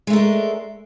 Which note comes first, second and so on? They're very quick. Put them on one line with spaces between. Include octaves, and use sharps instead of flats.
G#3 A3 A#4 D4